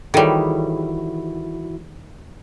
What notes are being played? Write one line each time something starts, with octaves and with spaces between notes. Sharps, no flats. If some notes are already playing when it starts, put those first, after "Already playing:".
D#3 E3 G3 E4 F#4 G#4 A4 C#5